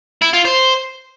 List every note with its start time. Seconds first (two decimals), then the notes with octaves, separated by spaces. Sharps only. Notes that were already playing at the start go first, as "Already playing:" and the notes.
0.22 E4
0.33 F4
0.45 C5